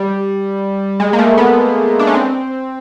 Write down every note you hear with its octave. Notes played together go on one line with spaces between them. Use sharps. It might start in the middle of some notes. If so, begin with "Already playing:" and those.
Already playing: G3
G#3
A#3
A3
B3
D4
C#4
C4